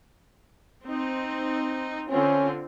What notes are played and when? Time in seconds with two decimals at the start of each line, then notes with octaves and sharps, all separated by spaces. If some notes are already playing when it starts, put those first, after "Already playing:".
0.84 C4 D#4
2.10 D3 C4 C#4 F4